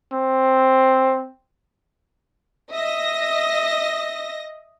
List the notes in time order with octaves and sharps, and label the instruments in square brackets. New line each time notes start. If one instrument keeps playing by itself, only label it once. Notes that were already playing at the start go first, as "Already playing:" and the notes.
[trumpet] C4
[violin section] D#5 A#6 [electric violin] E5 D#6